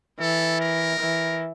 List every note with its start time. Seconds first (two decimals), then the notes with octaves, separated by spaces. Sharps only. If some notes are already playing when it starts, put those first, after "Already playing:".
0.20 E3 A4
0.60 A#4
1.01 E3